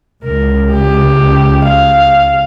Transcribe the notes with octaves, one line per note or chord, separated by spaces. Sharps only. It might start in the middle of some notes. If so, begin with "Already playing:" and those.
C#2 A#4
G4
F5